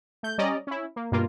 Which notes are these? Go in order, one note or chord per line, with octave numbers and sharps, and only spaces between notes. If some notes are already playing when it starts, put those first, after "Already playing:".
A3 G6
G3 C#4 D5 D#5 A#5
C#4 E4
A#3
G2 B2 A#3 F4